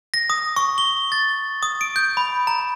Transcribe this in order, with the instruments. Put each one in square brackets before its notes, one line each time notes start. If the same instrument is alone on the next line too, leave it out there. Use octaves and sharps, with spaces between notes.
[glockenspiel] A#6
D#6
C#6
G7
A6
D#6
D7
G6
B5
A#5